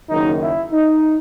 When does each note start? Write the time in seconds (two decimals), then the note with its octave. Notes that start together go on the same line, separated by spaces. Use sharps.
0.09 F#1 F#2 D#3 D#4
0.40 E4
0.72 D#4